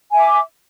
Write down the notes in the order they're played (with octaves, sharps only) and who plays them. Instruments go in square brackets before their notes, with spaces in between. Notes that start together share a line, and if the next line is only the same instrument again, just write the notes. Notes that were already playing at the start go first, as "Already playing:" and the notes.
[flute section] G#5
E5
D6